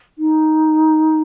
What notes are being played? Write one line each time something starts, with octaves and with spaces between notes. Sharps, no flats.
D#4